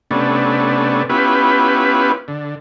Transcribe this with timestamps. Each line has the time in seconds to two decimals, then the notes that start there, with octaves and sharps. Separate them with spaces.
0.11 C3 A3 B3 C#4 D4
1.09 B3 C#4 E4 F4 G4 B4
2.28 D3